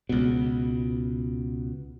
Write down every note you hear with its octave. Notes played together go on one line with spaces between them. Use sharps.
C#2 B2